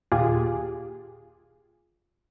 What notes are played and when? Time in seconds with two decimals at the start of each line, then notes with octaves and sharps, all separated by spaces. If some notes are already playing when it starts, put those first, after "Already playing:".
0.12 D#2 A#2 F4 G4 G#4